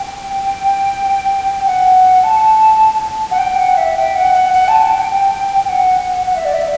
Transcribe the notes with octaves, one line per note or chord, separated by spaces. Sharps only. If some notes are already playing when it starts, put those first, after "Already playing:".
Already playing: G5
F#5
A5
F#5
G5
F#5
E5
G5
F#5
F#5
F#5
A5
G5
G5
G5
F#5
F#5
E5
D5
E5